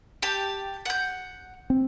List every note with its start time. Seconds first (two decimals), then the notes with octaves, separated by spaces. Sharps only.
0.22 G4 A5
0.86 F#5 G6
1.70 C4